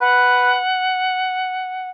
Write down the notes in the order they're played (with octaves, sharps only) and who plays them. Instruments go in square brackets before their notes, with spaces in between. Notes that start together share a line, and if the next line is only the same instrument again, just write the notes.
[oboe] B4 [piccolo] F#5